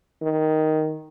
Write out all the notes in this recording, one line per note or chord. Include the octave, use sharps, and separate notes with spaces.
D#3